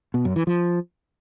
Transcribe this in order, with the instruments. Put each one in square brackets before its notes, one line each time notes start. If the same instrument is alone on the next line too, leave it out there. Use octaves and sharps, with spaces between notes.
[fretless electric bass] B2
F#2
E3
F3